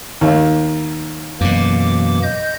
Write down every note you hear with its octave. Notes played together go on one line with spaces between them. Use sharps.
D#2
F#2 B2 E3 A#3 D6
D#5 G6